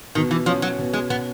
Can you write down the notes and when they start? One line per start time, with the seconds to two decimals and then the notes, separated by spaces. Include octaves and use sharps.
0.15 B2 D#3
0.31 E3
0.46 F3 C#4
0.62 F#3
0.78 B2
0.93 G#3
1.10 B2 B3